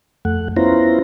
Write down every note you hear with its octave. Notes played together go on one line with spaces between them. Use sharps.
F2 A3 F#5
B3 C#4 E4 F4 C5 A#5